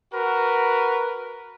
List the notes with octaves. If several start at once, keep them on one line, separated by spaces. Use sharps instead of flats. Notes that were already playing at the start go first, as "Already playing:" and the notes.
F#4 A#4 B4